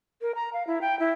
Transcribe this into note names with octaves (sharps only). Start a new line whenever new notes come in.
A#4
A#5
F5
E4
G5
E4